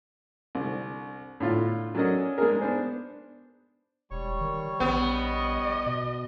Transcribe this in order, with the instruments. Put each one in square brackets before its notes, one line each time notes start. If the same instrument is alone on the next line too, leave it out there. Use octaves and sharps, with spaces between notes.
[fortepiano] C2 D3
A2 D3 D4 F4
F#3 C#4 D4 A4 A#4 D#5
G#3 A#3 D4 G#4 A#4
B3 D4 C5
[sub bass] E1 [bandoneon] G3 C#5 C#6
[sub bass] D#3
[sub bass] A#1 [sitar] B3
[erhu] D#5
[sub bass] B2